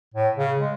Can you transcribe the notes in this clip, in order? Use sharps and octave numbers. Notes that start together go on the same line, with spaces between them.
A2
C#3
G#3